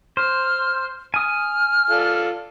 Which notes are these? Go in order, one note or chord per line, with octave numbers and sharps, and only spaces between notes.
C5 F6
G#5 D#6 F6
F4 A4 D5